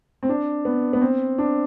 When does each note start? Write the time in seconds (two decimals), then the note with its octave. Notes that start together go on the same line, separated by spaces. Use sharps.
0.23 C4
0.29 D4
0.65 B3
0.93 B3
1.01 C4
1.38 D4